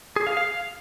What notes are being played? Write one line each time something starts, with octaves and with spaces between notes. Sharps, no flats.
G#4
F5
F5